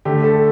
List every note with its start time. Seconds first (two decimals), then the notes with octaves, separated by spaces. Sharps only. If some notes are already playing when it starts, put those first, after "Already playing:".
0.05 D3 A3 G4
0.24 A4